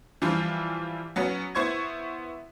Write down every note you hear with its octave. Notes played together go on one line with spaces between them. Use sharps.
E3 F3 G3 F4
F#3 B3 C#4 F#4
B3 E4 C5 C#6 G#6